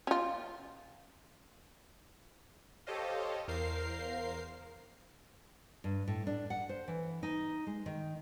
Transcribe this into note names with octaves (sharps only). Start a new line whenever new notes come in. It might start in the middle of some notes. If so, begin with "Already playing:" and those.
C#4 F4
G4 A4 C5 C#5 D#5 F5
E2 A#4 C5 F5 C7
G2
A2
D4
F#5
C5
E3
D#4
G#3
D#3